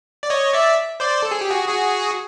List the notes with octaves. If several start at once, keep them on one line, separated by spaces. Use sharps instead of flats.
D5
C#5 D#5
D5 E5
C5 D5
A4
G#4
G4
F#4 G#4
F#4 G#4